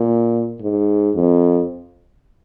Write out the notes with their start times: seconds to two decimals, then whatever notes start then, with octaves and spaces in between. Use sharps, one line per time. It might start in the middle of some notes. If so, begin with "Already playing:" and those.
Already playing: A#2
0.61 G#2
1.15 F2